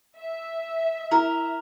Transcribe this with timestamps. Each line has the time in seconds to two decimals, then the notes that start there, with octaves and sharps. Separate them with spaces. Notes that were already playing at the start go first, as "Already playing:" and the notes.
0.18 E5
1.11 E4 A#4